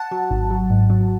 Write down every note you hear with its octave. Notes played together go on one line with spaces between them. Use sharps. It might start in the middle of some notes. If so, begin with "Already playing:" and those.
Already playing: F#5 A5
F#3
G#1
F#3
G#2
F#3